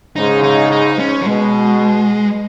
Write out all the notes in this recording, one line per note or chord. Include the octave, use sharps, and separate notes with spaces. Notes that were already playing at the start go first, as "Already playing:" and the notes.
G#2 C#3 D#4
D#4
D#4
C#4
F#3
B2 G#3